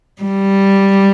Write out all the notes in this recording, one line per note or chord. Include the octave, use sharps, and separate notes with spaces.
G3